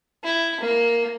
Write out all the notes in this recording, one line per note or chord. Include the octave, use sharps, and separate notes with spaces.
E4
A#3